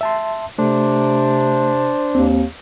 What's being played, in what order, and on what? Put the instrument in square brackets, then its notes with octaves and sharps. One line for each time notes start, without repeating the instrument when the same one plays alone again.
[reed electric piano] E5 A5 C6
[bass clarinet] C3 [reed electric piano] A3 [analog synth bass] D4 [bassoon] C5
[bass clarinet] D#2 [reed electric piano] C4